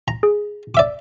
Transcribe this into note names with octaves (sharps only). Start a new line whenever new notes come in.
A#5
G#4
D5 E5 D6